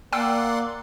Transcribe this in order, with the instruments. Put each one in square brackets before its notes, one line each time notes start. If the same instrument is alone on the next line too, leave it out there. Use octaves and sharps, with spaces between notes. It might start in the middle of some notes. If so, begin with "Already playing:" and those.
[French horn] A#3 [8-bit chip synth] D5 F#5 C6 [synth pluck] G5 E6